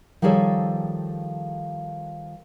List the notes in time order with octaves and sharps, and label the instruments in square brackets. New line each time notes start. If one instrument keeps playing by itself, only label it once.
[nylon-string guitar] D#3 F3 G3 G#4 A4 C#5